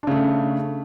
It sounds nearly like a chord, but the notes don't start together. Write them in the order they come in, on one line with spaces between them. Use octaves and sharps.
D4 C#3 A3